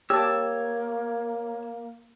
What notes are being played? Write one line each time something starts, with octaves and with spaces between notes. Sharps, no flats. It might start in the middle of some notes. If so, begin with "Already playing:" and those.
A#3 G4 C#5 A5 E6